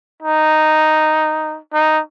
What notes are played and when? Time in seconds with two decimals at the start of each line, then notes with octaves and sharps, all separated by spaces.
0.22 D#4
1.74 D#4